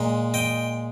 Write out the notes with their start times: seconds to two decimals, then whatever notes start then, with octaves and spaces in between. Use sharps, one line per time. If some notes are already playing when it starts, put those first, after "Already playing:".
Already playing: A#2 G#3
0.34 D#5 G5